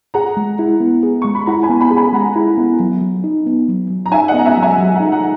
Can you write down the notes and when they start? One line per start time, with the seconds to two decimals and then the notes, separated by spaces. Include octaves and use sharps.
0.14 G#4 F#5 A#5
0.37 G#3
0.59 E4
0.80 B3
1.03 G#4
1.22 G#3 C#6
1.35 B5
1.46 E4 F#5 A#5
1.63 G#5 B5
1.70 B3
1.80 G#5 B5
1.91 G#4
1.97 G#5 B5
2.13 G#3 F#5 A#5
2.36 E4
2.58 B3
2.80 F#3
3.01 F#3
3.24 D#4
3.47 B3
3.68 F#3
3.90 F#3
4.06 A#5
4.12 D#4 E5 G#5
4.28 D#5 F#5
4.34 B3 A#5
4.45 E5 G#5
4.57 F#3
4.63 E5 G#5
4.78 F#3
4.95 F#5 A#5
5.00 D#4
5.12 F#5 A#5